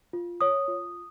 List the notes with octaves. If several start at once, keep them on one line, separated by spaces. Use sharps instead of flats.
F4
C#5 D#6
F4